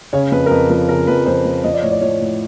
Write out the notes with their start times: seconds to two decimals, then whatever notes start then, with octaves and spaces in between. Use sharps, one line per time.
0.13 C#3 C#5
0.32 F2 B4
0.46 A#4
0.51 F2 B4
0.70 F3 A#4
0.89 C#3 A#4
1.07 F2 B4
1.26 F2 C5
1.45 F3
1.64 F3 D#5
1.74 D5
1.82 A2 C#5
1.92 D5
2.01 F3 C#5
2.21 A2